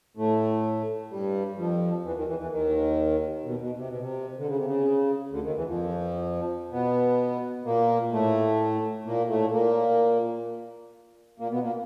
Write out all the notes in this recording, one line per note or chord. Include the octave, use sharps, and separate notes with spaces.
A2 A3
G2 G3
F2 F3
E2 E3
D#2 D#3
E2 E3
E2 E3
D#2 D#3
B2
B2
C3
B2
C3
D3
C#3
C3
C#3
D2 D3
D#2 D#3
E2 E3
F2 F3
B2 B3
A#2 A#3
A2 A3
A#2 A#3
A2 A3
A#2 A#3
A#2 A#3
B2 B3
A#2 A#3